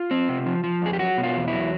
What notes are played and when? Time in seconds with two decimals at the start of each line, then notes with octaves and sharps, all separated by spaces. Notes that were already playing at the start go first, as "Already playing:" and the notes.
Already playing: F4
0.11 C4
0.29 C3
0.46 F3
0.64 F3
0.82 F2 G#4
0.93 G4
0.99 F#3 F#4
1.18 B2
1.23 F4
1.36 E2
1.48 F#3 E4